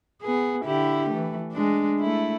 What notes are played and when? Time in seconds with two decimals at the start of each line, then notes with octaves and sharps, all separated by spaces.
0.22 B3 G#4
0.65 D3 E4 G4
1.11 E3 A3
1.53 G#3 D4
2.00 A3 E4